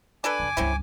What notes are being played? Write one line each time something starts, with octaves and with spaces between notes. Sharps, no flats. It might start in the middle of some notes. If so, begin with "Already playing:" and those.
D4 A4 B4 G#5 D6
F2 C#3
C#2 G2 C4 C#4 E4